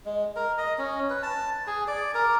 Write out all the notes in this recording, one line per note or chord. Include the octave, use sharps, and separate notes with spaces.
G#3
A#4
D#5
C#4
B4
A5
G#4
D5
A#4